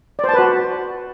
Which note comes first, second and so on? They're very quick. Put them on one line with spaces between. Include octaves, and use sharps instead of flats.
D5 C5 A5 B4 F#4